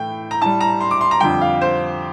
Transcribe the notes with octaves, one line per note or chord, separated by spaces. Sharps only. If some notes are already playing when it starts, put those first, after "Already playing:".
Already playing: A2 E3 A3 G5
A#5
A2 G3 A5
A#5
C6
D6
C6
A#5
F2 D3 G3 G5
F5
C5